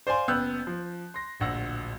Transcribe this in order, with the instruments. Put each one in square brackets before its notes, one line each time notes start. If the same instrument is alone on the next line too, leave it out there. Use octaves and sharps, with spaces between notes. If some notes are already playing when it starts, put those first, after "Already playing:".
[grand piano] C5 D5 F5 G#5 C6
F#1 B3 G5 E6 F#6 G6
F3
C6 A#6
D1 A#1 F#5 E6